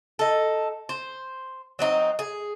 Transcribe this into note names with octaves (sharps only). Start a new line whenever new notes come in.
D#4 A4
C5
F#3 C4 D#4
G#4